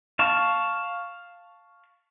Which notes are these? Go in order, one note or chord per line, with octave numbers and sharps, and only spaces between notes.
F5 A5 C#6